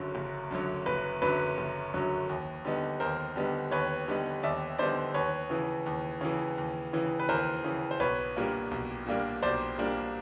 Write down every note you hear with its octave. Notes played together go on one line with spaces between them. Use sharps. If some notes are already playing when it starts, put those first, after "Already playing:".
Already playing: F#1 F#2 D3 F#3
F#1
F#2 D3 F#3
F#1 B4
F#2 D3 F#3 B4
F#1
F#2 D3 F#3
D#2
D3 G3 B3 D#4
D#2 A#4 C5
D3 G3 B3 D#4
D#2 B4 C#5
D3 G3 B3 D#4
D#2 D5 E5
D3 G3 B3 D#4 C5 D5
D#2 B4 C#5
C#3 E3
D#2
C#3 E3
D#2
C#3 E3
B4
D#2 A#4 C5
C#3 E3
C5
B1 B4 C#5
A#2 G3 A#3 D4
B1
A#2 G3 A#3 D4
B1 C5 D5
A#2 G3 A#3 D4